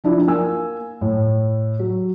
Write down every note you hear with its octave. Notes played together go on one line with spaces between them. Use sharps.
F3 D4 E4 F4
A#3 G#5 E6
A2
F#3